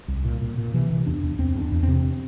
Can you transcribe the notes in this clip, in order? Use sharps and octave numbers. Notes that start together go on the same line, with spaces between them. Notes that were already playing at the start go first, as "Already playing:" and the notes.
C2
A#2
A#2
A#2
C3 E3
C3
E2 D4
E2
E2 C4
E2
D4
E2
C3 C4